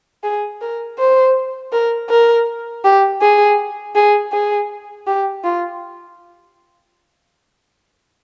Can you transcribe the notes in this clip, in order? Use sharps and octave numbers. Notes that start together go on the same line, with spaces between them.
G#4
A#4
C5
A#4
A#4
G4
G#4
G#4
G#4
G4
F4